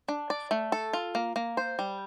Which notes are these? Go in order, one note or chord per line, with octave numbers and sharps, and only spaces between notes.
D4
D5
A3
A4
F4
A#3
A#3
C5
G3